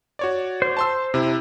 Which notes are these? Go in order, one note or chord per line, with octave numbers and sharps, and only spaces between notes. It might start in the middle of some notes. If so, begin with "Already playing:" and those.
F#4 C#5 D5
C5
A5 C6 E6
C3 E4